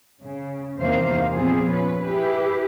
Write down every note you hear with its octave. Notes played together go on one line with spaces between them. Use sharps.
C#3
E2 C3 D#3 A#3 C5 F5
A#2 F3 B3 C4 F4 G#4
C#4 B4
E4 G4 G#4 B4